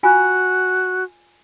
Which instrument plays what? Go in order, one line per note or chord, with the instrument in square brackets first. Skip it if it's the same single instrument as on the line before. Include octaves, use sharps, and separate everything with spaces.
[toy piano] F4 G#5 [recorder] F#4